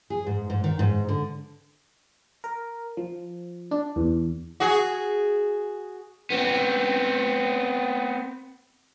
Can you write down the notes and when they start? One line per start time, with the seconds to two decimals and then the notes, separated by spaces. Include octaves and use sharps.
0.10 G#4
0.27 G#2
0.50 G#2
0.64 D#3
0.79 G#2
1.09 D3
2.44 A#4
2.97 F3
3.71 D4
3.96 E2
4.60 F#4 G#4
6.30 B3 C4